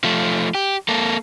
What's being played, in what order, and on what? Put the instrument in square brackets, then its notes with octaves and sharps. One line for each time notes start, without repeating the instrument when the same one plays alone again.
[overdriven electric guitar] F3 A3
G4
A#3 A4